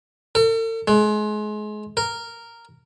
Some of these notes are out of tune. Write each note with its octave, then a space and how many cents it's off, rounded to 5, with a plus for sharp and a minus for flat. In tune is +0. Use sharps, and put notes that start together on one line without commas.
A4 +45
G#3 +30
A#4 -10